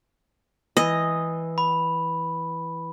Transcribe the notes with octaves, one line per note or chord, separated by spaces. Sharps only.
E3 D#5
B5